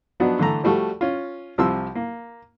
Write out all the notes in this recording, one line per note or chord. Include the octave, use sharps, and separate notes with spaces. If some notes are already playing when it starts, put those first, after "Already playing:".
F3 F#3 B3 D4 D#4 F#4
D3 E3 A3 A#5
F3 G3 A3 F#4
C#4 F4
C2 C3 F3 C4 C6 E6
A#3